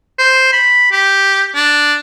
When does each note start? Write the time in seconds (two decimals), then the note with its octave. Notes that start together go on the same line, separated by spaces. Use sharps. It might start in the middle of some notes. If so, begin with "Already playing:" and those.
0.18 C5
0.53 B5
0.92 G4
1.55 D4